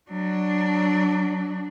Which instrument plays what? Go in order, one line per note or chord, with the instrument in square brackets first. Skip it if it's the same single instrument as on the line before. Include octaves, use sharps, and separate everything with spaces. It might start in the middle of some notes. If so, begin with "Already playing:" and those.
[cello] F#3 D4